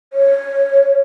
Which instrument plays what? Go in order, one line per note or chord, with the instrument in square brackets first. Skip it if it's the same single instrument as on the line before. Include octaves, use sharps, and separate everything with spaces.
[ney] C#5